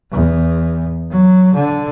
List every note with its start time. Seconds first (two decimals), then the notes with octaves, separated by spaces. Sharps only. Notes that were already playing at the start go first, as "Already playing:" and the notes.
0.12 E2
1.11 F#3
1.54 D3